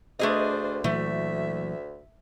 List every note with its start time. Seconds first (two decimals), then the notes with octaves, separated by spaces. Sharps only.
0.19 D2 A3 D4 G#4 B4 C5 D#5
0.84 A#2 E3 F#3 A3 E5